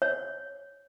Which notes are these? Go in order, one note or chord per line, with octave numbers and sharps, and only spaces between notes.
C#5